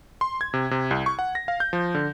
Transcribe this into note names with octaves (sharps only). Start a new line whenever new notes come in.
C6
G#6
C3
C3
C2
C#6
F#5
A#6
F5
G6
F3
D3